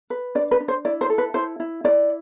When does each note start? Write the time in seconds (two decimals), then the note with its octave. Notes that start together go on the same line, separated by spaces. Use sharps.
0.10 B4
0.35 D4 D5
0.51 B4
0.60 D4
0.68 C5
0.85 E4 D5
1.01 C5
1.10 A4
1.18 B4
1.34 E4 C5
1.60 E4
1.84 E4 D5